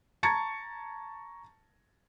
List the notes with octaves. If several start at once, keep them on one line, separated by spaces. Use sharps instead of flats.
A5 A#5 C#6 G#6 A6 C#7